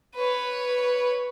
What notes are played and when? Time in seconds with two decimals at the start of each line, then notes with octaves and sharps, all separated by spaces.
0.15 B4 C#5